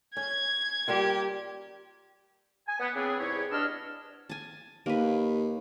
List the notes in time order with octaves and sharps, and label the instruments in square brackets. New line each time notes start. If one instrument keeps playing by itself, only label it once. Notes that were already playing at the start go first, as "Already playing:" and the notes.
[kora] C#4 [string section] G#6
[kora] G3 A#3 F4 [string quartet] G4
[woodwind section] G#5
B3
C#3 B3 C4 D4 E4 G#4
E2 G#2 E4 G4 C#5
G2 B2 D4 D#5 E6 F6
[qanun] G#5 A5
[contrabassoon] D#2 [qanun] A#3 B4